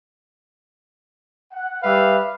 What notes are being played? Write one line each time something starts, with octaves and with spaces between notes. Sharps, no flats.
F#5
G3 B4 E5 F5